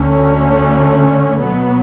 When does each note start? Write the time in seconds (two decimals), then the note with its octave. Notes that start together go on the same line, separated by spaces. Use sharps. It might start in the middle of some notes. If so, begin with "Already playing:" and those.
Already playing: D2 D3 A3 C#4
1.39 B2 F#3 B3